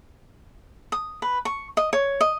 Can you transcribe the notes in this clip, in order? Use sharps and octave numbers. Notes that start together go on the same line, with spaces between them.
D#6
B4
C#6
D#5
C#5
D#5